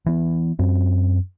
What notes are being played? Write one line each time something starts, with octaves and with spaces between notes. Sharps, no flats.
E3 B3
F#2 C4